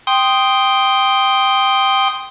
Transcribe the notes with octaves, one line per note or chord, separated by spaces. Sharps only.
G5 C6 D#6